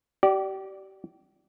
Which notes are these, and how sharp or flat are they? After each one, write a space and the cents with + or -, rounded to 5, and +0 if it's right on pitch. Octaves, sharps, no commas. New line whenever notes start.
G4 -35 D5 +0